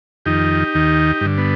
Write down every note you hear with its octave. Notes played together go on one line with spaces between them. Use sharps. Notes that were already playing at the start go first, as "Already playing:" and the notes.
F2 D#3 D#4 G4
D#2 D#3
G2 D3
B3